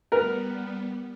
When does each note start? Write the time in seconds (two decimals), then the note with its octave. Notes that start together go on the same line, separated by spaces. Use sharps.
0.12 G3 B3 A#4 B4